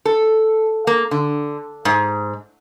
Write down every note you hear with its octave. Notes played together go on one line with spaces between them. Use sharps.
A4
A#3
D3
G#2